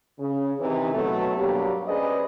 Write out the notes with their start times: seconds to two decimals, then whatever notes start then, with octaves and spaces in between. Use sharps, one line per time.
0.20 C#3
0.60 C3 D#3 E3
0.94 B2 F#3 A3
1.36 G2 F#3 G3 A#3 G4
1.88 C#4 G#4 B4 C5 D5 D#5